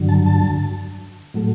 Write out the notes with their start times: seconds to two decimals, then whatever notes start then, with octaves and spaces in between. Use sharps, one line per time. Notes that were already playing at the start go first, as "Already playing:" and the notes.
Already playing: G2 D3 F#3
0.09 A5
0.26 A5
1.34 A2 F#3 A3